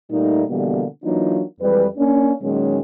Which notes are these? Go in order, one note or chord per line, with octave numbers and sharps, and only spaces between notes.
A#2 G3 A3 A#3 D#4
B2 D3 E3 G3 A#3 B3
E3 F#3 A#3 D4 D#4 F4
F2 E3 G3 G#3 B4
A#3 C#4 D4
A#2 D#3 F#3 G#3 C#4